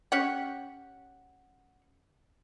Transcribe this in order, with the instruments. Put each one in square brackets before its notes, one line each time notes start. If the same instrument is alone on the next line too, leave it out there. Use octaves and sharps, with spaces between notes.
[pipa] C#4 G4 C#5 F#5